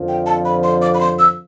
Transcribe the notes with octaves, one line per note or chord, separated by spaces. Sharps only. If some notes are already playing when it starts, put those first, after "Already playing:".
Already playing: F2 D3 F3
G5
A5
B5
C6
D6
B5
C6
E6